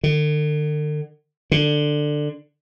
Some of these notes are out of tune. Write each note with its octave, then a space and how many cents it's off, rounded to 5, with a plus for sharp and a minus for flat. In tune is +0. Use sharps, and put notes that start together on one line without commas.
D3 +45
D3 +15